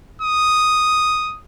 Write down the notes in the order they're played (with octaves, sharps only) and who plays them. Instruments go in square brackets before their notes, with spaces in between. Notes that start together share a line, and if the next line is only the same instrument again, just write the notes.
[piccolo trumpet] D#6